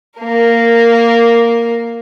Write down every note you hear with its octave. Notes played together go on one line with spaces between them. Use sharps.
A#3 A#4